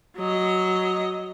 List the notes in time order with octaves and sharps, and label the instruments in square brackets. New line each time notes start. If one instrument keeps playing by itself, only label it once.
[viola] F#3 D#5